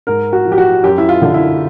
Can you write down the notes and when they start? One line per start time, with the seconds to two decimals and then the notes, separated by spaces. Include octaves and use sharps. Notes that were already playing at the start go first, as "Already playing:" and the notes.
0.07 G#2 A#4
0.33 F#4
0.45 F3
0.52 G4
0.58 F#4
0.84 F#2 G4
0.98 E4
1.09 F4
1.22 D3
1.34 E4